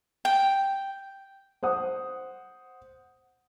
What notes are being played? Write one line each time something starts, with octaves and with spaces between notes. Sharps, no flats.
G5
C5 F#5 D#6